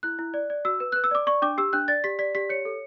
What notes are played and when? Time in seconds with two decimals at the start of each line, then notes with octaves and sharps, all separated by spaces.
0.03 E4 F#6
0.19 E4
0.34 D5
0.50 D5
0.65 F#4 E6
0.80 B4
0.92 B4 F#6
1.04 E6
1.11 D5 D6
1.27 D5 C#6
1.42 D4 D6
1.58 G4 E6
1.73 D4 F#6
1.88 D5 A6
2.04 G4 B6
2.19 D5 B6
2.35 G4 B6
2.49 C#5 C#7
2.65 A4